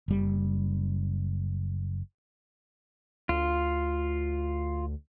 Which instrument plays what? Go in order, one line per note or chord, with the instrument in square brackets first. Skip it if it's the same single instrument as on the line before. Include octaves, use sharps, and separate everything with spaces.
[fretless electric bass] F#1 G3
[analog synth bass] D2 [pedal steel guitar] F4